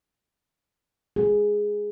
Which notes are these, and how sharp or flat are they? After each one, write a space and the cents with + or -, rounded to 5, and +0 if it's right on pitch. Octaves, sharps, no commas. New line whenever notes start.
G#4 +0